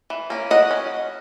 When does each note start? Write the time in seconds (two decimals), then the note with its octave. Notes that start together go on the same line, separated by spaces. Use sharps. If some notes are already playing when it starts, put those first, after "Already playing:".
0.10 E3
0.30 A#3 C#4
0.51 F#3 D#5 F#5
0.71 C#4